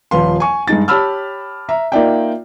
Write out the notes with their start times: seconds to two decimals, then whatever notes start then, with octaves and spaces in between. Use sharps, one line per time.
0.11 D#1 F3 B4 F5 C6
0.40 G#5 C#6
0.67 G2 G#3 D#4 A6
0.88 G4 C#5 A5 B5 E6 F6
1.69 E5 A#5
1.92 A#3 D#4 F4 D5 E5 G5